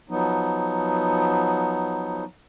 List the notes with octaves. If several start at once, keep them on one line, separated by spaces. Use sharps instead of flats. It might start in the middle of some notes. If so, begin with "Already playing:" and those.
F3 F#3 B3 D#4